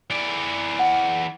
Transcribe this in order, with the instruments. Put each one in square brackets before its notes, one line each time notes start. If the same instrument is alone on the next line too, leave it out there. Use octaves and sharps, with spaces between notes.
[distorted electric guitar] E3 D5
[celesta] F#5